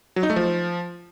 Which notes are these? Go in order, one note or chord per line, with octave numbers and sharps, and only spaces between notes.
F#3
D#4
A3
F3